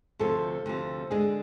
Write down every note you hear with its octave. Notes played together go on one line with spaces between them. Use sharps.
D2 C3 F3 A4
D2 C3 F3
D3 G#3 D4 G#4